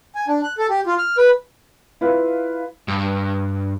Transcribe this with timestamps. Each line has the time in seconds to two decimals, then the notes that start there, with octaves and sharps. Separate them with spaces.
0.15 G#5
0.28 D4
0.43 F#6
0.58 A4
0.70 G4
0.87 F4
0.98 F6
1.18 B4
2.01 E4 F4 B4 F5
2.88 G2